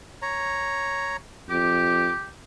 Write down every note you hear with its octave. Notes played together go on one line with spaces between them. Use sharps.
C#5 A#5
F2 G4 D6